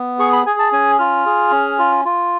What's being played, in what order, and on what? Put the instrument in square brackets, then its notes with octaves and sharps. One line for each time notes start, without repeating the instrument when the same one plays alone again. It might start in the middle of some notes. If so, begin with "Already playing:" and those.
Already playing: [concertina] B3
G#4 C#6
B5
G#4 G#5
A5
C#4 G#5
F4 F6
G#4
C#4
F4
F4